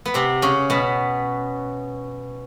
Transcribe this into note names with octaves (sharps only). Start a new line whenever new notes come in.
B3
C3 C4
C#3 C#4
B2 B3